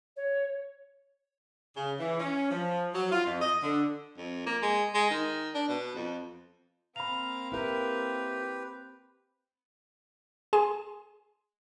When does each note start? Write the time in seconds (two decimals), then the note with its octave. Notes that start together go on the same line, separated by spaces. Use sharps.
0.16 C#5
1.76 C#3
2.00 E3
2.19 C#4
2.50 F3
2.94 F#3
3.12 F4
3.26 F2
3.41 D#5
3.63 D3
4.17 F2
4.46 A#3
4.62 G#3
4.95 G#3
5.11 D#3
5.55 D4
5.68 B2
5.95 F2
6.96 A#3 C4 F5 A#5 B5 F7
7.52 E4 G4 A#4 B4
10.53 G#4 G#5 C6 D#7 E7